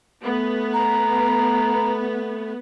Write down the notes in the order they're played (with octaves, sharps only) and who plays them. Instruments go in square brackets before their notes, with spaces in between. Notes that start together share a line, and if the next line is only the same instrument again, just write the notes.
[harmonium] A3 [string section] B3
[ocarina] A#5